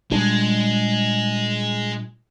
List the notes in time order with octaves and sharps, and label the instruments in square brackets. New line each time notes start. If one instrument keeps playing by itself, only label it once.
[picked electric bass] A#2 G3 D4 [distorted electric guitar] G#3